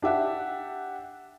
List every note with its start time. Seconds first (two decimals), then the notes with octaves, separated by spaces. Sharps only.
0.02 D4 G4 E5 F#5